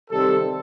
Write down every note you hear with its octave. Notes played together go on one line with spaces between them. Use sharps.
C3 D#3 G3 C4 A4